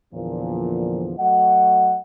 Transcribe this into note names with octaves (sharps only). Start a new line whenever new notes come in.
E2 A#2 D3 F3
F#3 A3 F#4 D#5 F#5